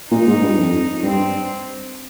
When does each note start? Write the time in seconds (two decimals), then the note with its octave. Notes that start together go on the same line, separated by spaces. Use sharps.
0.11 A#2 D#4
0.26 G#2
0.41 G2
0.57 F2
1.03 G2 C4